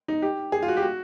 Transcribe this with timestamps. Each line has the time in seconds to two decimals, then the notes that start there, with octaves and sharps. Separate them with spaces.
0.08 D#4
0.22 G4
0.52 G#4
0.62 F4
0.68 F#4
0.77 G4
0.82 F#4